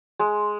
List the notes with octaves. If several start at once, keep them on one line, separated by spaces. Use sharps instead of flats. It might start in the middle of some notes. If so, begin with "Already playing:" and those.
G#3